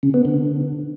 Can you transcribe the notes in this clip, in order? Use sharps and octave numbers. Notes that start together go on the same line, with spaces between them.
C#3
B3
D3